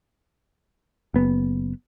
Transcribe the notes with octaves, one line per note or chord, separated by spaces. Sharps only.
F#1 B3